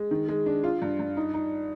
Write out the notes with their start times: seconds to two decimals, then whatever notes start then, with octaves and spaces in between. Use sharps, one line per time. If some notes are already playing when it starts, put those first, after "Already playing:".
Already playing: G#3
0.11 D#3
0.28 G#3
0.46 D4
0.64 F4
0.82 G2
0.99 G2
1.17 D#4
1.34 D#4